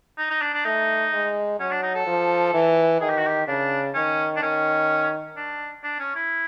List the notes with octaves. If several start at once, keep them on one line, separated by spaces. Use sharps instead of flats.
D#4
D#4
D4
D4
A3 D#4
G#3
F#3 C#4
D4
D#4
A4
F3
E3
D#3 G#4
G4
F#4
G4
C#3 D4
D#3 C#4
D4
D#3 C#4
D4
D4
C#4
E4